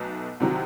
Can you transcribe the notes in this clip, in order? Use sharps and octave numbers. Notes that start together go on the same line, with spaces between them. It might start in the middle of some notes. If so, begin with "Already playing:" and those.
Already playing: B1 B2 A3 D#4
C2 C3 D#3 F#3